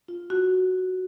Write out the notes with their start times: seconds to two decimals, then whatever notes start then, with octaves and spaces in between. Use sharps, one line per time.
0.08 F4
0.30 F#4